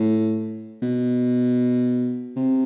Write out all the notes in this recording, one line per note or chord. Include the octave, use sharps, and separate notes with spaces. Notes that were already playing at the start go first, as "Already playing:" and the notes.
Already playing: A2
B2
C3